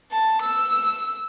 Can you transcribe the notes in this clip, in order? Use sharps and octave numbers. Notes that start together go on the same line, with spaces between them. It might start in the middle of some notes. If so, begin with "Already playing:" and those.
A5
E6